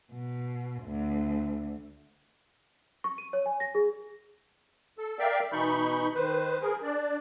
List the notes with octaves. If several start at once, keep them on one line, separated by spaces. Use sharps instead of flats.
B2
D2
C#6
D#7
C#5
G#5
A#6
G#4
A4
A#4 D5 E5 F5 G5
B2 E3 D#4 B5 C#6 G6
D#3 B4 C5
G#4 A#4
D4 D5